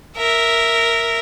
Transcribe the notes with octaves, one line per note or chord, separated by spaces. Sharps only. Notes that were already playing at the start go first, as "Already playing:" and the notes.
A#4 E5